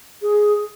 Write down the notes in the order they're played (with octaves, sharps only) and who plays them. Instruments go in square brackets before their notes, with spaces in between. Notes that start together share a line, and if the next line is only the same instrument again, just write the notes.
[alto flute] G#4